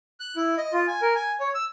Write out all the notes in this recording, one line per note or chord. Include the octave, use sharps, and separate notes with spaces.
F#6
E4
D#5
F4
G#5
A#4
G#5
C#5
E6